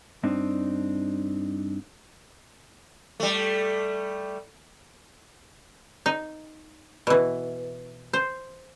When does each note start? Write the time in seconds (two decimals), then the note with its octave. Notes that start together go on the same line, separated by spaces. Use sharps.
0.23 G2 C4 D4 D#4
3.20 G3 A3
6.06 D#4
7.07 B2 E3
8.13 C5